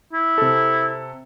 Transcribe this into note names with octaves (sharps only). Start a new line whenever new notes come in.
E4
C3 A4